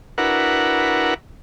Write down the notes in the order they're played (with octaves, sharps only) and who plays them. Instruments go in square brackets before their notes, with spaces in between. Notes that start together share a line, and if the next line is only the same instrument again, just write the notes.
[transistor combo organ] D4 E4 F#4 A#4 B4 F#5